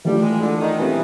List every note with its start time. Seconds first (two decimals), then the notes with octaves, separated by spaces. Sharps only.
0.05 E3 G3 A3 D4 F4
0.23 G#3
0.42 D3
0.61 D#3
0.78 B2 E3 G3 C4